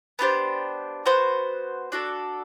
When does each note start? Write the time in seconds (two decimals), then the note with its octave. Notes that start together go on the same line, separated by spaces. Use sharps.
0.19 B3 D4 G4 C5
1.06 B3 F#4 C5
1.92 D4 F#4 A4 D5